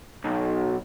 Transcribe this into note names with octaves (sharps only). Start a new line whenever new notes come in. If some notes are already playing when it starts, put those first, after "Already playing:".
B1